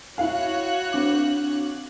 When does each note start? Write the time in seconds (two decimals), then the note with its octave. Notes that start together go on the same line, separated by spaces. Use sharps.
0.18 E4 F#4 C#5 F5 F#6
0.93 C4 D4 D6